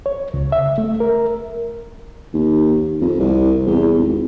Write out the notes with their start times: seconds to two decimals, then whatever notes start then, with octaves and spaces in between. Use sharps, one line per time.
0.06 C#5
0.34 C#2
0.52 E5
0.78 A3
1.00 A#4
2.34 D#2
3.02 F2
3.20 C2
3.67 E2
3.99 G#1